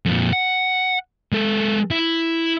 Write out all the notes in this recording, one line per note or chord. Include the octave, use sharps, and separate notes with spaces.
F2 A#2
F#5
G#3 A4
E4